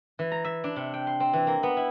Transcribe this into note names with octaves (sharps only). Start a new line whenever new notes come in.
E3
A#5
E5
D4
C3
G5
C6
C4
E3
A#3
B3
E4